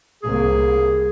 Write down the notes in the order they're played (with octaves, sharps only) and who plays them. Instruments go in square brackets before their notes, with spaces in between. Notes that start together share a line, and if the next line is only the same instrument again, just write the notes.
[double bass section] C2 A#3 [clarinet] G#4